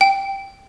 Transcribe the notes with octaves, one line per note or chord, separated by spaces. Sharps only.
G5